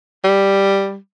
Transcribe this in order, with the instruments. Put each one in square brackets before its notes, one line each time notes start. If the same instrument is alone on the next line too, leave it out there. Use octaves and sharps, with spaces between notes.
[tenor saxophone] G3